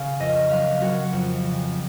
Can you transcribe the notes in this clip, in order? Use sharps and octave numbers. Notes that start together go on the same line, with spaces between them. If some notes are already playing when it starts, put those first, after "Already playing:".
Already playing: C#3 F5
F2 D#5
F#3 F5
F#3 F#4 F#5
F2
C#3